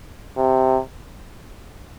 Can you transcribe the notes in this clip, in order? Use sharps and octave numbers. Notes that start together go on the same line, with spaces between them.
C3